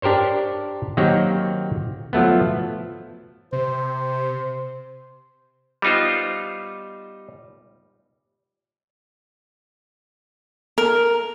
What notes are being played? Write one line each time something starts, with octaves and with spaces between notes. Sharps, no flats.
D4 G4 A#4 C5 C#5
D#3 F#3 A#3 C4 G4 C#5
F3 F#3 A3 B3
C3 C5
G3 B3 D#4 F4 C5
A#4